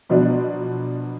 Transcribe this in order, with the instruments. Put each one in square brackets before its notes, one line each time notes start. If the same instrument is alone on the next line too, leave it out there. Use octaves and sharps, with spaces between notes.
[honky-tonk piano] B2 F3 F#3 B3 D4